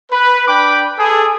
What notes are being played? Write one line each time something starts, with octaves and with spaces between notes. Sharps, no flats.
B4
D4 B4 G5 B5 D6
G#4 A4